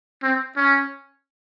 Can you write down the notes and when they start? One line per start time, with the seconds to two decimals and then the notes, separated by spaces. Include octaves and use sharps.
0.23 C4
0.56 C#4